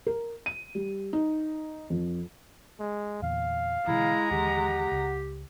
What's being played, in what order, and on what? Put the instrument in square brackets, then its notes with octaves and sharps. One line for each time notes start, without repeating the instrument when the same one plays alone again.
[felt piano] A#4
D#7
G3
D#4
F2
[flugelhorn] G#3
[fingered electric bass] E2 A#2 D3 [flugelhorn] F5
[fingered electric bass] B2 D3 E3 [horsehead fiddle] G#3 A#5 [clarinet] E4
[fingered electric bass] D#2 D3 E3 [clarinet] G4 [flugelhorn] F#5
[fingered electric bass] C#2